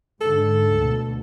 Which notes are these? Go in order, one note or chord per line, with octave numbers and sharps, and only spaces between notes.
G#2 D3 A4
D2 B2